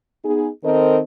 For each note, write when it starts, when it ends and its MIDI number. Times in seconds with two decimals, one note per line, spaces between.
0.24 0.48 59
0.24 0.48 63
0.24 0.48 68
0.64 0.99 51
0.64 0.99 60
0.64 0.99 69
0.64 0.99 70
0.64 0.99 72
0.64 0.99 75